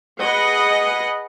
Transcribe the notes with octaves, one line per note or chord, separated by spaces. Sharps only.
G#4 B4 D#5 F#5